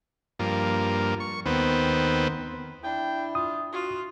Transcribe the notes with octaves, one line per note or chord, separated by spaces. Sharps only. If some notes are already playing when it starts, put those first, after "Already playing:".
G2 F3 A#3
C#6
D#2 B3 C4
D4 E4 G5
F4 D#6
F4 F#4